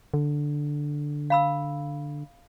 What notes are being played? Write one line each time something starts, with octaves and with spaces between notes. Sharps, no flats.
D3
F5 B5 E6